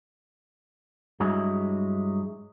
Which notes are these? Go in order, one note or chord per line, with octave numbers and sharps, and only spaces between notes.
G2 F#3 G#3 E4